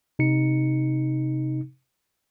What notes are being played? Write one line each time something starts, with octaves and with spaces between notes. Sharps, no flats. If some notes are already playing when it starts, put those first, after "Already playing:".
C3 D#4 C#7